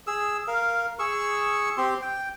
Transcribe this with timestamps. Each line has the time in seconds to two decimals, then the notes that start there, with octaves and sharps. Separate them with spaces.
0.07 G#4 E6
0.48 A#4 F5
0.99 G#4 C#6 E6
1.78 C4 G4 C6
2.02 G5